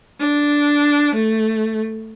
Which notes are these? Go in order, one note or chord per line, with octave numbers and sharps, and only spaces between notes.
D4
A3